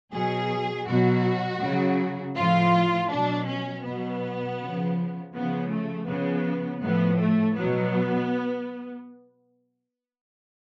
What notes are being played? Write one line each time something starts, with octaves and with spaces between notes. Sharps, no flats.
B2 F#3 G#4
B2 F#3 F#4
C#3
F#3
A2 F3 F4
B2 F#3 D4
C#4
B2 F#3 B3
C#3 F3
C#3 F3 B3
A3
C#3 F3 B3
A2 F3 B3
A3
B2 F#3 B3